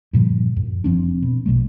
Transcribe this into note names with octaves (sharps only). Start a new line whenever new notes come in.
G2 A#2 D3 F3
F#2
F1 F3 C4 D4
B2
A#1 B2 F#3 A3